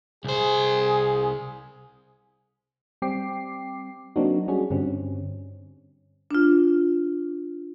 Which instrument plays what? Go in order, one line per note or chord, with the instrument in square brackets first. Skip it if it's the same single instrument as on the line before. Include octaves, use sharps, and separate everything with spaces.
[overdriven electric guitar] C2 C5 [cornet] G#4
[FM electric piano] G3 C4 G5 D6 C7
F#3 A#3 C4 D4 D#4 F#4
G3 C#4 F#4 G#4
G2 D3 G3 C4 C#4
[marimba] D4 F4